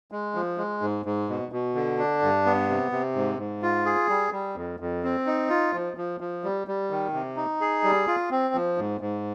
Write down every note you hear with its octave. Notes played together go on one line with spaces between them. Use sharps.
G#3
F3
G#3
G#2
G#2
B2
B2
D3
D4
G2
B3
C3
C3
G#2
G#2
F4
G#4
G3
G3
F2
F2
C4
D#4
F4
F3
F3
F3
G3
G3
D#3
C3
D#4
G#4
G3
F4
C4
F3
G#2
G#2